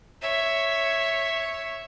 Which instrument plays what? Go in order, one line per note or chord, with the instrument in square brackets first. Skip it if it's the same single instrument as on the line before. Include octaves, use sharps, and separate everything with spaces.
[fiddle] C#5 E5